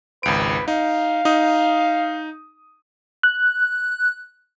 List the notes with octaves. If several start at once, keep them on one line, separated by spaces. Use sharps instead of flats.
G#1 C#2 B4 D7
D#4 F5
D#4 D#6
F#6